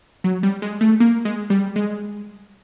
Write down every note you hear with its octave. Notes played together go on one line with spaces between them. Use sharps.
F#3
G3
G#3
A3
A#3
G#3
G3
G#3